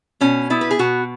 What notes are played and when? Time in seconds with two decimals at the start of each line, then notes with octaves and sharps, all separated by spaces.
0.21 B2 C#4
0.50 B3 E4
0.61 B4
0.71 G#4
0.79 B2 F#4